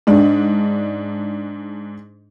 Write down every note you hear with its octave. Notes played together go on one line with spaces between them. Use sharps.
G#2 D4